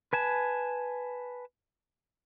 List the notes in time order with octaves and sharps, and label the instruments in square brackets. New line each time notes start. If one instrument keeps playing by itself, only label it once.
[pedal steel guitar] B4 G#5 A5